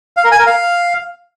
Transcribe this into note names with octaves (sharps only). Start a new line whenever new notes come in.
F5
A#4
G#5
A#4
F5